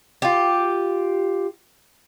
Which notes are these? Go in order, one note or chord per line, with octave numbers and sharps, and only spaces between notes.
F4 G4